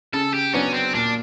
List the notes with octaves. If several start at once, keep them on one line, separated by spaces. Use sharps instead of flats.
C#3 A4
G4
F#3 B3 C#4 D4
C4
A#2 D4